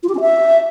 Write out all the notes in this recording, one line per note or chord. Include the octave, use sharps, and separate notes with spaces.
F4
G4
C#4
E5